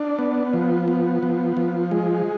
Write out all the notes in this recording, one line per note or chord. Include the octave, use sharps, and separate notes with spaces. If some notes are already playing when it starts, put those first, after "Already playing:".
Already playing: D4
B3
F3
B3
F3
F3
G#3